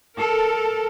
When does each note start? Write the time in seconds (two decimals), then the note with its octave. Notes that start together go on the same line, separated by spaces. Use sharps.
0.17 A4 A#4